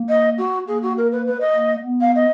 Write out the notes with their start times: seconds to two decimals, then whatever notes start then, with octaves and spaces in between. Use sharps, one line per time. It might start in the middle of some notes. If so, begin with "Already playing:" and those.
Already playing: A#3
0.08 D#5
0.38 F#4
0.67 A#3 G#4
0.82 F#4
0.97 A#4
1.11 B4
1.26 B4
1.40 D#5
1.55 A#3
1.85 B3
2.00 F5
2.15 D#5